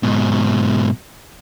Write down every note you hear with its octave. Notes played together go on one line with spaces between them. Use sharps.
G#2 B2